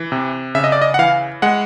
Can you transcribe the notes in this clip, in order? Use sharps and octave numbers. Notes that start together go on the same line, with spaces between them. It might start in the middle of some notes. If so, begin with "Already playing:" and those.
Already playing: E3
C3
C#3 E5
D#5
D5
D#5
F#5
E3 F5
G#3 F#5